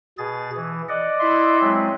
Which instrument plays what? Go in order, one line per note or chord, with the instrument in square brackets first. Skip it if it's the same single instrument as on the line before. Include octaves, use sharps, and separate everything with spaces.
[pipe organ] B2 G#4 A6
E3
D5 D#5 F#5
[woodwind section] E4 E5 C6
[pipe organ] F#3 G#3 C4